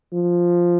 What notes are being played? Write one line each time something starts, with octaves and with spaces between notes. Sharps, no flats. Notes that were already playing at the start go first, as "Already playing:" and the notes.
F3